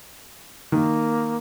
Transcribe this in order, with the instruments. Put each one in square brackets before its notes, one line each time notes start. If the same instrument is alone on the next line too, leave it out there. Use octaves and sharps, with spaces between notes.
[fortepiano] D#3 [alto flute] A#3